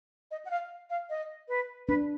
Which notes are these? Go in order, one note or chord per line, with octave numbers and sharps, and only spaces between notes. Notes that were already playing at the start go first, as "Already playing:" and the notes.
D#5
F#5
F5
F5
D#5
B4
D4 B4